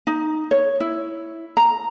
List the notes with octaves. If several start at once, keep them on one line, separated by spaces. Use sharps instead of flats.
D#4
C#5
E4
A#5